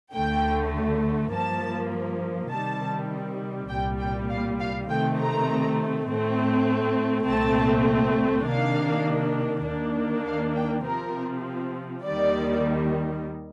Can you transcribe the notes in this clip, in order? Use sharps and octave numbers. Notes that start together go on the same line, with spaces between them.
D2 D3 A3 G5
G2 F3 A#3 A5
C3 D#3 G3 C4 A5
C2 A#2 G3 G5
G5
F5
F5
C3 D#3 A3 C4 G5
A#5
A2 A3 C4
C2 A#2 A3 C4 A5
C3 D#3 A#3 D4 F5
D#2 D#3 A#3 D4
F5
G5
C3 F3 C4 A#4
D#2 D#3 G3 D5